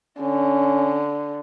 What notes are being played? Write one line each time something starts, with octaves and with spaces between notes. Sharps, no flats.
D3 C#4